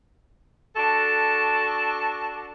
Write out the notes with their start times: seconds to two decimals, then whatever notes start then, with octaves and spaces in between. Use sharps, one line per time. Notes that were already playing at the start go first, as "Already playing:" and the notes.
0.76 D4 F#4 A4